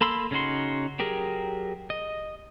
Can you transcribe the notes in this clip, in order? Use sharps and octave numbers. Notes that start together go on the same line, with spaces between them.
A#3 A4 B5 C6 E6
C#3 C#4 D#4 F#4 C6
F#3 G4 G#4 A#4
D#5